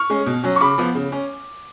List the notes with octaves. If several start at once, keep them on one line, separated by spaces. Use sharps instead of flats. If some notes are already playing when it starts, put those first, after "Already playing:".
Already playing: C#6 F6
G#3 C#4
B2
F#3 C#4
C#6
C#3 B5 D6
F3 B3
C#3
C#4